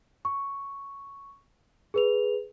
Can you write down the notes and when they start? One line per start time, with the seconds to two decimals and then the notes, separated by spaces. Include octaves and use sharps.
0.25 C#6
1.94 G#4 B4 F7